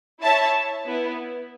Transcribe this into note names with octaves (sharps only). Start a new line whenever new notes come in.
E4 C#5 E5 A5
B3 E4